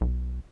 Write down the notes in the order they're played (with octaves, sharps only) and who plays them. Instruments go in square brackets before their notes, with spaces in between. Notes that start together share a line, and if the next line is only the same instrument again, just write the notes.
[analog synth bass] B1